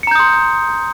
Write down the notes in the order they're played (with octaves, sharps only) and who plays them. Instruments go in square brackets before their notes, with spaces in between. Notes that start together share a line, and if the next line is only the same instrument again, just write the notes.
[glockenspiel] C#7
A#5
G6
D#6
C6